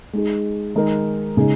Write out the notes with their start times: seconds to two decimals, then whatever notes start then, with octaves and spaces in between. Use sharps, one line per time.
0.13 G#3 D#4 G#4
0.75 D#3 G#3 D#4 A#4
1.37 C#3 G#3 D#4 G#4